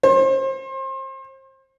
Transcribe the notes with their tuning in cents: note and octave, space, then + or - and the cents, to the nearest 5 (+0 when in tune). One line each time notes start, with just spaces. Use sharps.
C5 +30